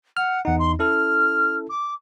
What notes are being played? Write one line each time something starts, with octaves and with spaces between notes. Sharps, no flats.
F#5 F6
E2 D#4 F#5
C6
C#4 E4 A4 F6
D6